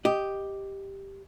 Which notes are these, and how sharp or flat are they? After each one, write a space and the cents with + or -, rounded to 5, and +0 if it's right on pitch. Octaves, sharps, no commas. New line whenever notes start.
G4 +0 D#5 +0